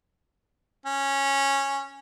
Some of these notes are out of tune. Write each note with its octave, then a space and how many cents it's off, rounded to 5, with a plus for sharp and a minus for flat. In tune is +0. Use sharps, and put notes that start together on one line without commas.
C#4 -10